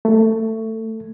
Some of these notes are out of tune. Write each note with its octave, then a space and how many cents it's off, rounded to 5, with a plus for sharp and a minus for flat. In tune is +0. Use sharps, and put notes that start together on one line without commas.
A3 +20